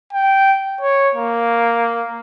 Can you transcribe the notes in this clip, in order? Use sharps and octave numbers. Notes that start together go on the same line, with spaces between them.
G5
C#5
A#3